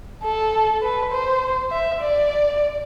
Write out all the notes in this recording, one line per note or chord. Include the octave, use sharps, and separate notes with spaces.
A4
B4
C5
E5
D5